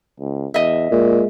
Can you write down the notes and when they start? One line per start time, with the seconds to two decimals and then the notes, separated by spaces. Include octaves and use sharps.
0.20 C#2
0.54 E2 D#5 E5
0.91 A#2 G#3